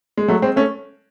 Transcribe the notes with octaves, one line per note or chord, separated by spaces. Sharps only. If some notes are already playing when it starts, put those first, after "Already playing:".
G#3
F#3 A3
G#3 C4
A3 C#4